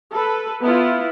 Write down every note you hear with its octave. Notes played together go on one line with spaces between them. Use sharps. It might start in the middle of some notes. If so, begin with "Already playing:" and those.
A4 B4
B3 E4 F4